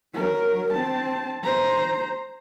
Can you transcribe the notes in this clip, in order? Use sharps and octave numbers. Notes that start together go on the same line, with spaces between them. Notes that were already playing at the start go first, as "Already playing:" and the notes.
F#3 A#4
C4 A5
C5 A#5